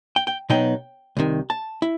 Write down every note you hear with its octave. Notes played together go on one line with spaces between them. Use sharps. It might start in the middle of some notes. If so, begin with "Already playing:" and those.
G5
G5
B2 F#3 B3 D#4 G5
C2 C3 D#3
A5
E4